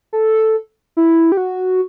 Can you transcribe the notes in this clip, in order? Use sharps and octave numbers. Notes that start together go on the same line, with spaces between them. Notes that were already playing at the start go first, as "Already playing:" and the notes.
A4
E4
G4
F#4